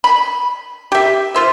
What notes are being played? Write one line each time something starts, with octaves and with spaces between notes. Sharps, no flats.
B5
G4 E5
F4 C5 E5